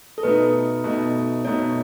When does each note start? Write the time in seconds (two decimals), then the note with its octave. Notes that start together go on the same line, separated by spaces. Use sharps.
0.18 A4
0.23 B2 A3 D#4 B4
0.84 B2 A3 D#4
1.45 B2 A3 D#4 C#5